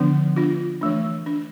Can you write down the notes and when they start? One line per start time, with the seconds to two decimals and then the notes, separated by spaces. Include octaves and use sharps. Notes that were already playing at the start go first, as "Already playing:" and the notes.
Already playing: D3 F3 B3 D4
0.36 D4 F4
0.81 E3 A3 D4
1.26 D4